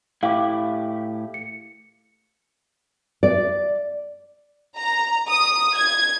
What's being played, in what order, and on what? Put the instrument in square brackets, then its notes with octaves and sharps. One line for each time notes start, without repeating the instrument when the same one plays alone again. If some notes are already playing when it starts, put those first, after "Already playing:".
[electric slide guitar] A2 E4 G4 [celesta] F5 D6
[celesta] C#7
[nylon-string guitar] D5
[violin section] A#5
D#6
G#6